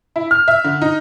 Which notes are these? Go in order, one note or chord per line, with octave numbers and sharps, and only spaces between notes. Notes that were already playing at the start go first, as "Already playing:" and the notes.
E4
F6
E5
D3
D#4